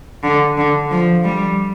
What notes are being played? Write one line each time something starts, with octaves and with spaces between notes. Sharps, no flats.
D3
D3
F3
G3